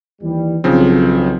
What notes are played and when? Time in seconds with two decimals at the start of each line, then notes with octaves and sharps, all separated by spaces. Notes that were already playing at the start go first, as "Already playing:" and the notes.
0.21 D#2 E3 G3
0.64 B1 C#3 F3 C4